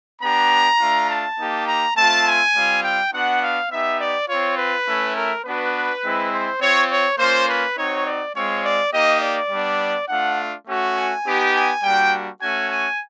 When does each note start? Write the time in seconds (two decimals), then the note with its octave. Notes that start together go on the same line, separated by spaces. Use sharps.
0.22 B3 D4 G4 A#5
0.80 A3 D4 F4
1.09 A5
1.39 A#3 D#4 G4
1.68 A#5
1.96 A3 C4 F4 A5
2.26 G#5
2.55 G3 C4 F4
2.83 G5
3.12 B3 D4 F#4 F#5
3.41 F5
3.70 B3 D#4 G4 E5
3.99 D5
4.28 C4 F4 C#5
4.57 B4
4.86 A3 C#4 E4
5.16 A#4
5.44 B3 D4 F#4 B4
6.03 G#3 C4 E4
6.32 C5
6.60 C4 F4 C#5
6.90 C#5
7.18 A#3 C#4 F4 C5
7.48 B4
7.77 C4 D#4 F#4 C#5
8.05 D5
8.35 G#3 C4 F4 C#5
8.63 D5
8.93 A#3 D#4 G4 D#5
9.21 D5
9.50 G3 B3 D4
10.09 A3 D4 F4 F#5
10.67 A3 C#4 F#4
10.96 G#5
11.25 B3 D#4 G4
11.55 G#5
11.82 G3 A#3 D4 F#4 G5
12.41 A3 C#4 F#4 G#5
12.70 G#5